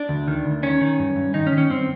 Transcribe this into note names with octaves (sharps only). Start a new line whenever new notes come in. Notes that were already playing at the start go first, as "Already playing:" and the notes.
Already playing: D4
D2
D#3
D2
D#3 C#4
D#3
G2
G2
D#3 D#4
C#4
D#3
C#4
G2 C4